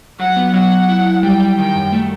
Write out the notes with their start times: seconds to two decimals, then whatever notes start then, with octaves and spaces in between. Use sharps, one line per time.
0.20 F#3 F#5
0.37 B3
0.53 F#3 F#5
0.71 F#3
0.89 E4
1.06 E4
1.23 G3 G5
1.40 G3
1.58 D#3 G5
1.76 F#2
1.92 A3